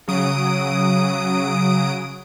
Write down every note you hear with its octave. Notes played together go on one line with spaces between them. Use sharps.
C#3 F#3 D#6 D7